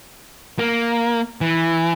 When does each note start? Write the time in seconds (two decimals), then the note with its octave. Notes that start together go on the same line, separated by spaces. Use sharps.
0.59 A#3
1.41 E3